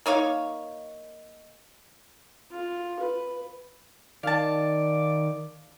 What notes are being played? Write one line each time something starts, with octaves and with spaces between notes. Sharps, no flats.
A#3 D#4 C#5 F5
F4
B4
D#3 D5 F5 A5